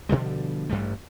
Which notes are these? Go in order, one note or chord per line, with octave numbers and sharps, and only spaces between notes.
B2 D3 F3 G3
A1 G2 G3 A3